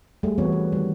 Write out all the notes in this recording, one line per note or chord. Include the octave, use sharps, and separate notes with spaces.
G3 A3 G#4
E3 G3 B3 C4 F#4 C#5
B4
D#3 G3